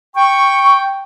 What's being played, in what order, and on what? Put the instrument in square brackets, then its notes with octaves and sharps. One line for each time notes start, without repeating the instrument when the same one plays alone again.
[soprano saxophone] G5 [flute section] C#6